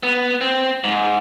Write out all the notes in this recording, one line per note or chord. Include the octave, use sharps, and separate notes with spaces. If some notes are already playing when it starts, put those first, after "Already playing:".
B3
C4
G#2